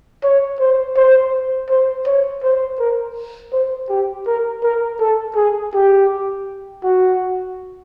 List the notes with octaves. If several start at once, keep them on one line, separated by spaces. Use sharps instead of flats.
C#5
C5
C5
C5
C#5
C5
A#4
C5
G4
A#4
A#4
A4
G#4
G4
F#4